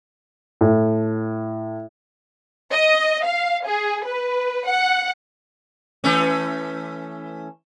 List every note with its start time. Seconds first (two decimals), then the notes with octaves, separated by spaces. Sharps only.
0.61 A2
2.71 D#5
3.25 F5
3.66 G#4
4.05 B4
4.67 F#5
6.04 E3 A3 C#4